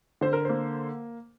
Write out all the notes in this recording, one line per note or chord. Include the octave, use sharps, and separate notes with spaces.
D3 C5
A#4
A#3 C5